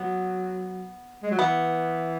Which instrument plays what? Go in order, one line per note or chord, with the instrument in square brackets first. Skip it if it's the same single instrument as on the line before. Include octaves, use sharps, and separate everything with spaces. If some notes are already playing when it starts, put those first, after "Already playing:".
Already playing: [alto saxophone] F#3 [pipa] B3
[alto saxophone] G#3
F#3
[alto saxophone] E3 [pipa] B3